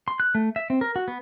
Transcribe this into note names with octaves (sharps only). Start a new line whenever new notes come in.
C6
F#6
A3
E5
C4
A#4
F#4
B3